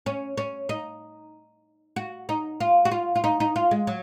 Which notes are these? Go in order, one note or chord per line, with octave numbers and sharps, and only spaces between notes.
C#4
C#4
D#4
F#4
D#4
F4
F#4
F4
F4
D#4
D#4
F4
G#3
F#3